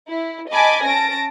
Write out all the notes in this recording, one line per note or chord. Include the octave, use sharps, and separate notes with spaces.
E4
D#5 G#5 A5 B5 D6
C#4 A5 A#6 D7